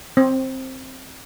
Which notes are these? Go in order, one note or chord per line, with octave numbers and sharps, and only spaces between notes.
C4